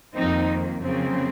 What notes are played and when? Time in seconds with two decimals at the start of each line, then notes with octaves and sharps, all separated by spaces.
0.15 F2 D#3 A#3 C4 D#4
0.80 F2 C#3 F#3 A#3 C4